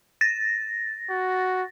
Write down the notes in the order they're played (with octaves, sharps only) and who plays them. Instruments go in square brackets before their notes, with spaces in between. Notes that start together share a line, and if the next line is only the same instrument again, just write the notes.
[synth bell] A6 A#6
[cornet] F#4